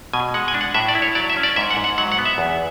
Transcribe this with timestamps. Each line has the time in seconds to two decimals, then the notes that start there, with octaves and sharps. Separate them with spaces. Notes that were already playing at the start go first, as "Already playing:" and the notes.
0.13 B2 G#5
0.34 G#3 F#5
0.48 G#5
0.54 D4
0.61 F#5
0.74 A2 E5
0.88 D5
0.95 E4
1.02 C#5
1.15 F#3 D5
1.30 E5
1.37 C#4
1.43 D5
1.56 G#2 E5
1.71 F#5
1.77 G#2
1.84 F#5
1.98 F#3 F#5
2.12 F#5
2.18 B3
2.26 E5
2.38 E2